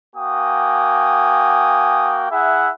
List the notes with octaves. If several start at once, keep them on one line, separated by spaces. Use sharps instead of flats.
A#3 F#4 G5 G#5 D#6
E4 G#4 E5 F#5